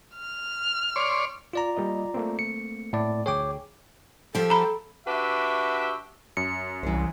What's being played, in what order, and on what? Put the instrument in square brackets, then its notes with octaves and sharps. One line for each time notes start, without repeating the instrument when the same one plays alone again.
[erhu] F6
[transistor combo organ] C#5 D5 C6
[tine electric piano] F4 D5 A#5
[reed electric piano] G3 A#3 D#5
A3 A#3 C4
[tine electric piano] C#7
A2 D5
[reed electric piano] D2 G#4 [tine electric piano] C#5 G5 D6
[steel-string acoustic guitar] F3 G4 [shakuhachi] A4
[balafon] A#5 B5
[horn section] D4 F#4 G4 B4 E5
[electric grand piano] F#2 [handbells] C#7
[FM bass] C2 [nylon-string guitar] E3 C5